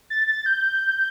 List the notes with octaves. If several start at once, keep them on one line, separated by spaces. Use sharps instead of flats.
A6
A6
G6